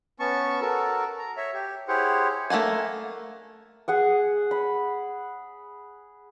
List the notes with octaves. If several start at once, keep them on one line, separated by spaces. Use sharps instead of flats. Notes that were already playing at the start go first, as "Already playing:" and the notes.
B3 C#4 A5 C#6
F#4 A4 A#4
A#5
C#5 E5
G4
E4 G4 G#4 C5 C#5 F#5
A3 A#3 F#5 G#5
G#4 F#5 G#5
B5